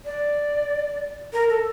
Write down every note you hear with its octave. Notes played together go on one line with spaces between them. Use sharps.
D5
A#4
A4